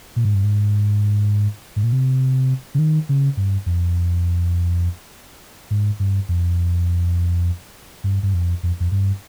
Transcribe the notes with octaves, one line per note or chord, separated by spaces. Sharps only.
A#2
G#2
G2
G#2
G#2
A#2
C3
C#3
D#3
C#3
G2
F2
G#2
G2
F2
G2
G2
F2
F2
F2
G2